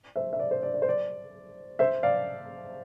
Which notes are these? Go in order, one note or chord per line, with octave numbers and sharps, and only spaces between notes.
C5 E5
E5
D5
C5
D5
D5
C5
D5
C5 E5
D5 F5